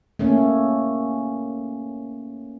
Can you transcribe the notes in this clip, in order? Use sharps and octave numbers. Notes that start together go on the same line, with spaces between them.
A3 A#3 C#4